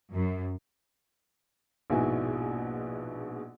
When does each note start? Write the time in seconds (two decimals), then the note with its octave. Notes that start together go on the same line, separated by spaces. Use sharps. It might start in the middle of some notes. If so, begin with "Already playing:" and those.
0.13 F#2
1.90 A#1 G#2 B2 E4 F#4 G#5